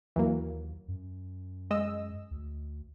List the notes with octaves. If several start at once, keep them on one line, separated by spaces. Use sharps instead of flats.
D#2 E3 F#3 A#3
F#2
G#3 D#5 E6
D2